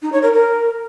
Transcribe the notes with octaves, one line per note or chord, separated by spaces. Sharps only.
D#4
C#5
A#4
A#4